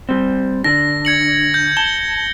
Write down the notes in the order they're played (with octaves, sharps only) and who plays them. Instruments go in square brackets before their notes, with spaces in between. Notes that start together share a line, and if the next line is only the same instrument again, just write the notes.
[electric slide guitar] G3 C4
[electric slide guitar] D3 D4 [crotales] A#6
[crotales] G#6 C#7 F#7
G6
[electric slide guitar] A5 [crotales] G7